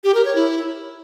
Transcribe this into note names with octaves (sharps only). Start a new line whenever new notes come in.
G4
A#4
C#5
E4